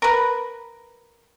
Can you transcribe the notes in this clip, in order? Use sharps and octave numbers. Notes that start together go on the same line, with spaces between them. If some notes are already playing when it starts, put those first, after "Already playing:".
A#4 B4